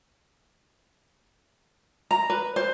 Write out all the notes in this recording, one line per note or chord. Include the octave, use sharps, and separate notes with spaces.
A#5
B4
C5